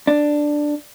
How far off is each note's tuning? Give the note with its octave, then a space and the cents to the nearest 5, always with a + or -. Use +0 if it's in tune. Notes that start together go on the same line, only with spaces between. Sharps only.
D4 +5